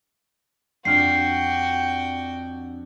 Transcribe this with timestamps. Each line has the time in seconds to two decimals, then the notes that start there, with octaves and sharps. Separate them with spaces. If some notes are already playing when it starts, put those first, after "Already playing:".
0.85 F2 D4 F#4 G5 F6 C7